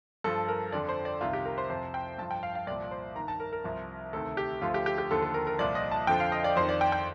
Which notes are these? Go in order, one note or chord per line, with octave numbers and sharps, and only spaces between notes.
G2 F3 A4
A#4
F2 D3 F3 D5
C5
D5
C2 C3 D#3 F4
G4
A#4
C5
F2 C3 F3 C5
G5
G2 F3 A5
G5
F5
F5
C2 A#2 F3 D5
C5
G2 D#3 A#5
A5
A#4
A#4
C2 C3 F3
D2 C3 D#3 A4
G4
D2 D3 F3 F4
G4
G4
G4
D#2 D3 F3 A4
A4
A#4
A#4
C2 A#2 F3 D5
D#5
A5
F2 D3 F3 G5
F5
D#5
D5
F2 D#3 C5
D5
G5
G5